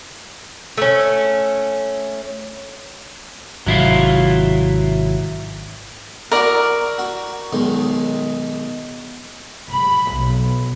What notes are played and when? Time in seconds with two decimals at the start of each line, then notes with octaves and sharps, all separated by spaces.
0.77 A3 C#4
3.66 G#1 C3 F#3 E4 F4
6.32 E4 F#4 A#4 D5
6.99 F#4
7.53 B1 D#3 G#3
9.68 B5
10.12 B1